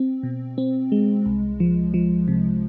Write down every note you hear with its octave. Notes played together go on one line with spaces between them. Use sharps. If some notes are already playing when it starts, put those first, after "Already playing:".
Already playing: C4
B2
C4
G#3
C2
F3
F3
C3